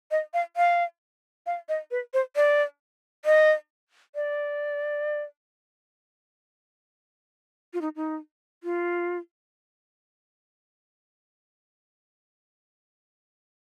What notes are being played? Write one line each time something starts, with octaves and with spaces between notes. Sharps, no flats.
D#5
F5
F5
F5
D#5
B4
C5
D5
D#5
D5
F4
D#4
D#4
F4